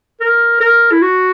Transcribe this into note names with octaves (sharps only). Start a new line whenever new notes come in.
A#4
A#4
E4
F#4